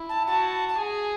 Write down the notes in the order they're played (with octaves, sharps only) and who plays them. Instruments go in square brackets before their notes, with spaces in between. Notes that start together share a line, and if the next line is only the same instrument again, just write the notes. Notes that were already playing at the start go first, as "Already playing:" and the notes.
Already playing: [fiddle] E4
[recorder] A5
[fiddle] F#4 [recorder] A5
[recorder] A5
[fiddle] G#4 [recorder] G#5